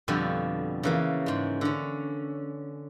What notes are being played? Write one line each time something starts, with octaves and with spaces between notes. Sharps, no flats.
F2 B2 D3 G3 F#4
C#3 E3 A#3
G#2 G#3
D3 C#4